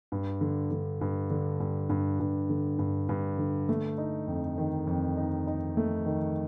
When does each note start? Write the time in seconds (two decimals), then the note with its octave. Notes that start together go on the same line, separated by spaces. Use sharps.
0.12 G2
0.41 D3
0.71 D3
1.01 G2
1.30 D3
1.60 G2
1.90 G2
2.20 G2
2.49 D3
2.79 G2
3.09 G2
3.38 D3
3.69 A3
3.98 D#4
4.28 F2
4.58 D#3
4.87 F2
5.17 D#4
5.47 D#4
5.77 A3
6.06 D#3